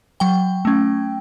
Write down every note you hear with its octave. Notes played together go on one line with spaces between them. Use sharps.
F#3 G5
A3 C#4